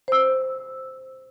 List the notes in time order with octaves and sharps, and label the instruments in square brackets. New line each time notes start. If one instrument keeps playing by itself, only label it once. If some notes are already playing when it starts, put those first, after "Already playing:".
[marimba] C5 E6